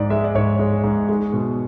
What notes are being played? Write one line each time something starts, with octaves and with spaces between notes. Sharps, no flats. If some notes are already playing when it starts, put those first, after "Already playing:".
Already playing: G#2 G#3 D5
G#3 E5
D5
G#2 C#5
G#3
G#2
G#3
B2